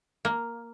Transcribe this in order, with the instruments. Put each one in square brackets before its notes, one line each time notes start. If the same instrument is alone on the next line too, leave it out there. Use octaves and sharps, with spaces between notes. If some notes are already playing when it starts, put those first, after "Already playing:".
[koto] A#3